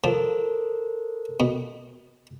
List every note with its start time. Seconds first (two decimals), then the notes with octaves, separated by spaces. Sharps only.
0.04 F3 A4 A#4 C5
1.40 B2